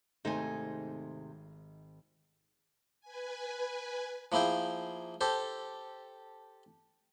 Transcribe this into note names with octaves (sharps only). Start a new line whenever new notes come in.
G#1 C3 A3 D#4 C5 G#5
B4 G#5
F3 A#3 E4 G#4 G5
G4 A4 C5